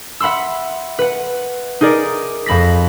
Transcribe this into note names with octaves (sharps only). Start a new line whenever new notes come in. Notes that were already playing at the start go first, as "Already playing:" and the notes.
E5 F#5 B5 C6 E6
B4 F#5
D#4 G#4 A#4 D5
F2 C4 B5 A#6 B6